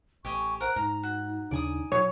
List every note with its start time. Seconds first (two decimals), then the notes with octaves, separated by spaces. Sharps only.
0.25 A1 G4 D#5 G#5 C#6
0.60 A#4 C5 F#5
0.76 G#2 D#4 A#5
1.03 F#4
1.51 D#2 C#3 D4 D5 G#5 D#6
1.92 A#2 F#3 C#5